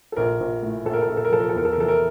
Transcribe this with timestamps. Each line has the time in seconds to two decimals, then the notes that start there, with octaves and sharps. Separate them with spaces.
0.12 A4
0.16 A#1 A#4
0.40 A#1
0.62 A2
0.86 A#1 A4
0.93 A#4
1.02 A4
1.09 A#1 A#4
1.17 A4
1.25 A#4
1.32 F3 A4
1.41 A#4
1.49 A4
1.54 E2 A#4
1.65 A4
1.73 A#4
1.78 E3 A4
1.88 A#4